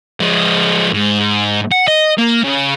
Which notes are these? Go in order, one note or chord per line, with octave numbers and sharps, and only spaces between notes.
F3 G#3
G#2
F#5
D#5
A#3
C#3